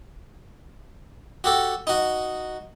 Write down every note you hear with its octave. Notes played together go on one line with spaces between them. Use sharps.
F#4 G4 A4
D#4 F#4